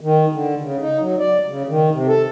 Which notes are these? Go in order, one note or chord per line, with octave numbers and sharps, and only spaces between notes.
D#3
D3
C#3
D#4
F#3
D5
C#3
D#3
C3
A4